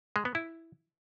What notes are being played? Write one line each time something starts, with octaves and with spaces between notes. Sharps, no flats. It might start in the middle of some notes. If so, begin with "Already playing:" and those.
G#3
B3
E4